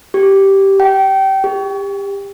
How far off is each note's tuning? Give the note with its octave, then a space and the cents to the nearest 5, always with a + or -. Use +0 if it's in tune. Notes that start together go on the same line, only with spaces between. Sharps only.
G4 -10
G5 -25
G4 +25